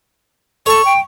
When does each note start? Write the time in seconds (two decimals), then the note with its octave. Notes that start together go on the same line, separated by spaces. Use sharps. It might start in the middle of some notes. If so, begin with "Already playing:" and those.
0.66 A4 C#5 C#6
0.85 G5